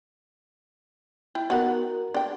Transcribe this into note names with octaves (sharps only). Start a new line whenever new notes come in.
E4 G5
B3 D#4 F#4 A#4 F#5
D4 G5